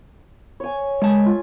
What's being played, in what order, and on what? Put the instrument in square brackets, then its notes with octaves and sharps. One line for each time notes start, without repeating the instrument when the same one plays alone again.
[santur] C#5 G#5
[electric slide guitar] G#3 A5 [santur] G#5
[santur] F4